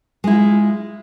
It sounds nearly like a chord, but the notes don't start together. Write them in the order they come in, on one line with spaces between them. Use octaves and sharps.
G#3 E4 F4